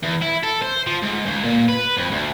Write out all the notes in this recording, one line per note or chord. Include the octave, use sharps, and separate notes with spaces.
E2
E4
A4
C5
F3
G#2
C#2
A#2
B4
F2
D2